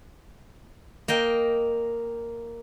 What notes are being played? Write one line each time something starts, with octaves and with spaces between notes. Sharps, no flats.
A#3 D#5 G5